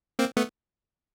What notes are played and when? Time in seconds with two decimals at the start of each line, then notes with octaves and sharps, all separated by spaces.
0.19 A#3 C4
0.37 A3 B3